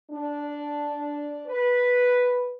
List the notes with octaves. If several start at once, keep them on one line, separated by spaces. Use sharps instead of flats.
D4
B4